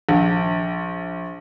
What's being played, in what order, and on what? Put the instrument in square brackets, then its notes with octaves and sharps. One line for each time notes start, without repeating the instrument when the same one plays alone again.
[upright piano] A#1